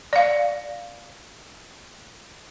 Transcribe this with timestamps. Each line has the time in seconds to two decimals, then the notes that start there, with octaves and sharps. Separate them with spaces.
0.13 D5 F5